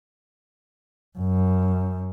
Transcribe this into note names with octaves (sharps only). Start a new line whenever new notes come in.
F#2